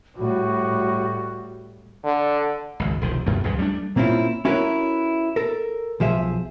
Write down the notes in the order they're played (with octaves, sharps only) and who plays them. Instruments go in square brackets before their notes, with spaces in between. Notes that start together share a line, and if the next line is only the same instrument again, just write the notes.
[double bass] A2 G3 [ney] F#4
[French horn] D3
[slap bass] G#1 C#2
E1 C2 D#3 F3
F#2 A3
C#2 G2 C#3 F3
G3 A3 B3 D4
[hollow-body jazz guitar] A#2 A#3 C4 C#4 E4 F4
C#4 E4 F#4 A#4 B4 C#5
A4 A#4
B1 F3 G#4 E5